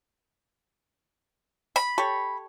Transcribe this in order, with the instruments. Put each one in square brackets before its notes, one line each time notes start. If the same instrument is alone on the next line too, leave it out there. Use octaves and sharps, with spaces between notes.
[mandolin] B5
[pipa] G4 A4 C#5